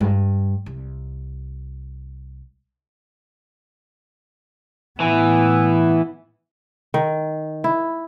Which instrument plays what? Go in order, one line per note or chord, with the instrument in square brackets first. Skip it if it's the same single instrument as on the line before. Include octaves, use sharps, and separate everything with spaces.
[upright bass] G2
C2
[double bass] A2 B3 [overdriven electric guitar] E3
[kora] D#3
E4